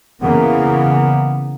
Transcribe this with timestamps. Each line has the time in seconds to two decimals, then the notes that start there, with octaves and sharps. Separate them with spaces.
0.22 C#3 E3 A#3 B3